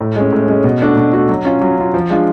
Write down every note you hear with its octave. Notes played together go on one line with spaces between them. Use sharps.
A2
G#3 C#4
A2
G#3 C#4
B2
A3 D4 F#4
B2
A3 D4 F#4
F#3
C#4 F4
F#3
C#4 F4
F3
G#3 D4 F4